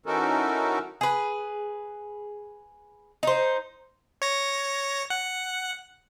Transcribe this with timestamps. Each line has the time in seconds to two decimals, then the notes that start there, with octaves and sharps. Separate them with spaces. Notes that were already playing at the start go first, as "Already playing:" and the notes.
0.06 E3 C#4 D#4 F#4 A4 A#4
1.01 G#4 B4
3.23 D#4 C5
4.22 C#5 A#6
5.10 F#5